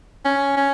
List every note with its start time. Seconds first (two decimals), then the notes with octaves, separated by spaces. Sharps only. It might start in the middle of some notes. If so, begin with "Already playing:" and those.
0.25 C#4
0.57 C#4